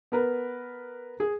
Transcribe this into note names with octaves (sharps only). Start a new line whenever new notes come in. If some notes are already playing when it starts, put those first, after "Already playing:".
B3 A#4 B4
G#4